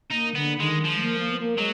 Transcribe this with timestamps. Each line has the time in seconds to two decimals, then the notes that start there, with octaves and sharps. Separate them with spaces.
0.10 A#3 D#4
0.35 D3 B3
0.59 D#3 G#3
0.84 F3
0.96 G#3
1.02 A#3
1.20 A#3
1.31 B3
1.38 A#3
1.58 F#3 G#3